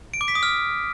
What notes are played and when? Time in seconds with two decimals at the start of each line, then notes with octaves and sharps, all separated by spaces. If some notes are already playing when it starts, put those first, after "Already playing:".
0.14 D7
0.21 D6
0.28 B6
0.35 D#6
0.43 F6